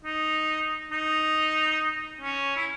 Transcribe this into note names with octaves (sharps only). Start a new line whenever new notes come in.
D#4
D#4
C#4
E4